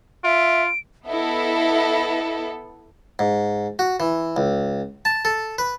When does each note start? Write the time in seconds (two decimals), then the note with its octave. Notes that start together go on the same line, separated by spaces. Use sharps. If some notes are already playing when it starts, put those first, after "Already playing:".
0.24 F4 E5 D7
1.05 B3 E4 A4 D#5 E5
3.19 G#2
3.79 F#4
4.00 E3
4.37 C#2
5.05 A5
5.25 A4
5.58 B4